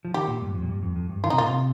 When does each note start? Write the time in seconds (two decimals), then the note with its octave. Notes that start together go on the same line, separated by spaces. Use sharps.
0.05 F3
0.14 D#3 G4
0.28 A#2
0.41 G2
0.55 F2
0.62 A#2
0.69 G2
0.83 F2
0.96 F2
1.09 G2
1.24 D#3 F4
1.30 C3 D#4
1.38 A#2 F4
1.47 C3